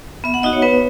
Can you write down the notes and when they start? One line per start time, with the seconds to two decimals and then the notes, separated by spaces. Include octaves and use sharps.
0.24 B3 E5
0.34 F#5
0.43 D#4 F#4 D#5
0.53 C#5
0.62 B3 B4